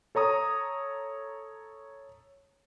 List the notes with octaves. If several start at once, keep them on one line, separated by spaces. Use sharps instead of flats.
A4 C#5 A#5 D#6